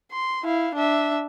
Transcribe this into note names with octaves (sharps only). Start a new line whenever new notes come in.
C6
E4 F5
D4 E5